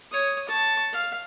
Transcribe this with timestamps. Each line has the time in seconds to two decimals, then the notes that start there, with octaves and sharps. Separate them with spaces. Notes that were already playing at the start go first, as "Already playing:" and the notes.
0.11 C#5 D#6
0.49 A5 C#6
0.93 F5